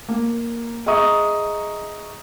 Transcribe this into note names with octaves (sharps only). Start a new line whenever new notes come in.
A#3
G#4 D#5 E5 A#5 C#6 D#6